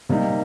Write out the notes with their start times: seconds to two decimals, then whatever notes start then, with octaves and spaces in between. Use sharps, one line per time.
0.09 C3 G3 A#3 D#4